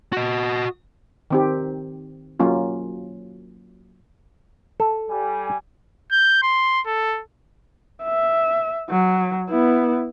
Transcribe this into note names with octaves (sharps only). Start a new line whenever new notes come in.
F#4 D#5
D#3 C4 G4
F#3 A#3 C#4 F4
A4
G3 G#5
G6
C6
A4
E5
F#3
B3 E4